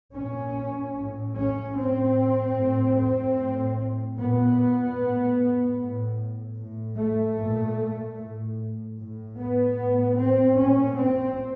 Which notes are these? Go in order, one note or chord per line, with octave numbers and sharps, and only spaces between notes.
A#2 C#4
A2
C#4
A2 C4
A2
C4
A2
A#2 B3
A2
A2
A2
A3
A#2
A2
A2
B3
A2
C4
A#2 C#4
C4